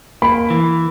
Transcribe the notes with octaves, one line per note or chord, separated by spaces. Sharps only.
A#3 B5
E3